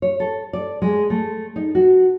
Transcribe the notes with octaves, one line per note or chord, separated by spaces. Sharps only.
C#5
A4
D5
G#3
A3
D#4
F#4